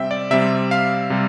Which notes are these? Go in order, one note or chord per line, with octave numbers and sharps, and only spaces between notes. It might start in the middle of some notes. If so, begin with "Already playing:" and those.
Already playing: C3 G3 C4 E5 G5
D5
C3 G3 C4 E5
F5
C3 G3